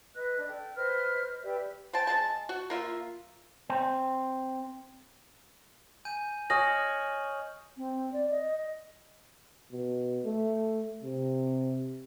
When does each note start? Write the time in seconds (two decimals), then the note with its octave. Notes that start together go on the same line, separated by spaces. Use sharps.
0.15 B4 D#5 F#6
0.36 D4
0.48 A4 G5
0.76 B4 C5 D#5 F6
1.42 G4 B4 D5 E5
1.93 C5 G5 A5
2.07 G#3 G#4 A5
2.49 F#4
2.70 A#3 F4 E5
3.70 C4
6.05 G#5 G6 D#7
6.50 C#5 D#5 G#5 D#6 F6 A#6 F#7
7.76 C4
8.12 D5
8.30 D#5
9.72 B2
10.25 A3
11.03 C3